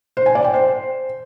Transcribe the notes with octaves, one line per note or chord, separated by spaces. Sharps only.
C5
G#5
D5
G5
C5